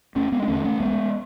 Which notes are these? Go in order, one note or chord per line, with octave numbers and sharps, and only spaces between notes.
E1 A3 C#4
G#3 B3
D4
E2 D3 A3 C#4
A3 C#4
B1 G#3 B3